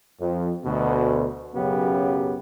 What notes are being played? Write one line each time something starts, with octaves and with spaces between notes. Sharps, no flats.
F2
D2 B2
B1 F#2 C#3 F#3 B3 G4